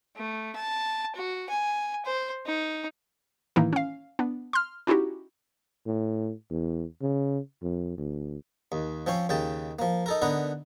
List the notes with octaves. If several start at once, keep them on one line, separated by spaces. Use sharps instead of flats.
A3
A5
F#4
G#5
C5
D#4
A2 D#3 E3 A#3 D#4 E4
C#4 F5
B3 D4
C6 F6
C#4 D#4 E4 F#4 G4
A2
E2
C#3
F2
D2
D#2
F3 C4 C#4 C5
D#2 C#3 G5 A5
F3 A#3
D#4 A4 A#4
D3 B3 D#4 A#4 B4